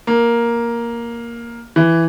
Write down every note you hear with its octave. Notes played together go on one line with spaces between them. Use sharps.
A#3
E3